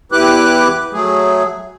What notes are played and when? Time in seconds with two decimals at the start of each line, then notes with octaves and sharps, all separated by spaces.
0.12 E2 E4 G4 B4 D6 F#6
0.93 F#3 A3 G#4